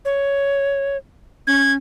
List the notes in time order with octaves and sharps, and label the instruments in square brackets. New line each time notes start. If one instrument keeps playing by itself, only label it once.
[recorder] C#5
[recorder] C#4 [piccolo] G#6